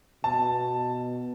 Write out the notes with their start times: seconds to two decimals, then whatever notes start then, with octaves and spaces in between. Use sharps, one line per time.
0.24 B2 A5